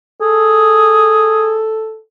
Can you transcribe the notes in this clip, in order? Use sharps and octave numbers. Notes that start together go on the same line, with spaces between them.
G#4 A4